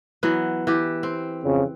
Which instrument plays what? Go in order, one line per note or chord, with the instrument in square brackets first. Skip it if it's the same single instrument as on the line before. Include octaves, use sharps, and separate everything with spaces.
[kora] E3 F#3 B3
E3 G4
C4
[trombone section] F2 C#3